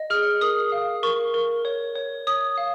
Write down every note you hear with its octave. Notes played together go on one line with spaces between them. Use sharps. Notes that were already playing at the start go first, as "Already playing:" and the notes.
Already playing: D#5
G#4 F6
A#4 D#6
F5
A#4 C#6
A#4
C#5
C#5
C#5 D#6
F5